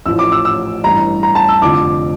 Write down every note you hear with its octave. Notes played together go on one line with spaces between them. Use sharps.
A1 A2 F3 E6
D6
E6
E6
A1 G2 E3 A#5
A#5
A5
E6
F1 F2 D3 F3 D6